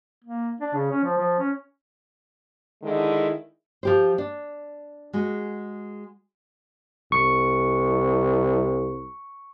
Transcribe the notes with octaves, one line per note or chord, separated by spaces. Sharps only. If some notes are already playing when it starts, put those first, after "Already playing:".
A#3
D4
C#3
C#4
F3
F3
C#4
D3 D#3 G#3 E4
F3 G4 C5
D4
G#3 F#4
C2 C#6